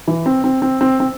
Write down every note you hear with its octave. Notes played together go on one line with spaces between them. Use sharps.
E3
C4
C4
C4
C4
C4